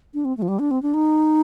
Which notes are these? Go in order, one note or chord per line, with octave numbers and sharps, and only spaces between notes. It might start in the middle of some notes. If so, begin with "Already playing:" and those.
D4
C4
A3
F3
G3
D4
C4
D4
D#4